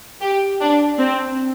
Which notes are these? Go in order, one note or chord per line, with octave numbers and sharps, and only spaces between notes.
G4
D4
C4